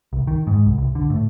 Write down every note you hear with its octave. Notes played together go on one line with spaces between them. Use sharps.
C2
D#3
G#2
C2
C2
D3
A2